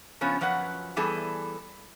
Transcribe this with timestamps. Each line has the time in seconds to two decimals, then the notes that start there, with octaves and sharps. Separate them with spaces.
0.21 C#3 F3 B3 C#4
0.41 F#2 F3 B4 C#5 F#5
0.96 E3 G3 B3 G#4 A4